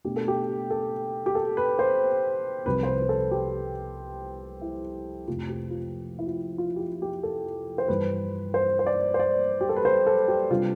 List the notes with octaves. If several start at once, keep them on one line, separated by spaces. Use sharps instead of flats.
B2 A3 D4 G4
A4
G4
A4
G4
A4
B4
C5
C2 C3 F3 C4 B4
C5
B4
B4
A4
G4
E4
F2 C3 F3 A3 F4
G4
F4
E4
F4
F4
G4
F4
G4
A4
C5
G2 E3 G3 B4
C5
C5
D5
C5
D5
G4
A4
B4
C5
A4
G4
C3 G3 D4 F4